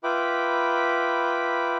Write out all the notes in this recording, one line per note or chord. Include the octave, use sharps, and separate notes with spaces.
F4 B4 E5 G5 B5 D6